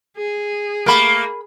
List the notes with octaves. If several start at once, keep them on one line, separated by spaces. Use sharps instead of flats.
G#4
A3 A#3 A#4 B5